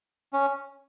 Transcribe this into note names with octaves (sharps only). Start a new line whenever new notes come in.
C#4